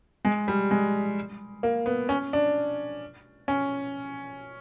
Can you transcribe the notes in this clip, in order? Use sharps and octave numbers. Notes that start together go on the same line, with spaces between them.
G#3
G3
G#3
A#3
B3
C#4
D4
C#4